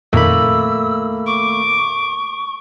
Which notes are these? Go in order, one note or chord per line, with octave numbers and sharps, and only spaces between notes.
F2 A#2 D#3 A3 A#3 B5 E6
C#6 D6